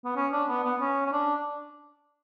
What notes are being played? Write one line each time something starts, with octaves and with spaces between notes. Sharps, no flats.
B3
C#4
D4
B3
B3
C#4
C#4
D4